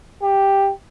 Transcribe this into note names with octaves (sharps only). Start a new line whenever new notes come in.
G4